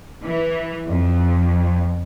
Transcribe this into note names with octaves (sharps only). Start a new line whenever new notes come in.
E3
F2